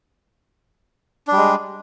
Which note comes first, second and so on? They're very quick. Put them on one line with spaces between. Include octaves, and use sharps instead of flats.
D4 G3 G#3